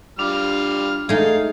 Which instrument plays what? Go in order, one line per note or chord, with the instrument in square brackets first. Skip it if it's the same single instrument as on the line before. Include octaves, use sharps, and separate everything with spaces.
[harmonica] G3 F4 F6 [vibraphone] D4
[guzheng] G#3 D#4 [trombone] A3 [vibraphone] G#4 A4 [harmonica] F5